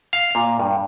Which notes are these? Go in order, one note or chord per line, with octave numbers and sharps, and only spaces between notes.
F5
A#2
G2